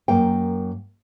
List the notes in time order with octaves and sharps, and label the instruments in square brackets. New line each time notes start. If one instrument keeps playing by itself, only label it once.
[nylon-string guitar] F#2 A#3 G5